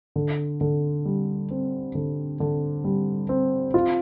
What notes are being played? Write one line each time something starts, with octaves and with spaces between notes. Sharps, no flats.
D3
D3
G3
C4
D3
D3
G3
C4
F4